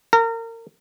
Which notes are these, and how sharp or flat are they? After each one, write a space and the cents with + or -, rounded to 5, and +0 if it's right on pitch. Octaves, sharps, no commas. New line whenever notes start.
A#4 -30